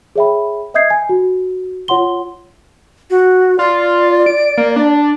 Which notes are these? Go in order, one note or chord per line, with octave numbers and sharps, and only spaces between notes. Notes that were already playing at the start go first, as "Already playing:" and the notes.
G#4 C#5 E5 G5 B5
D#5 E5 D#6 G6 G#6 C7
G#5
F#4
F4 C#5 F#5 C6 G7
F#4
F4 D5
D7
A#3
D4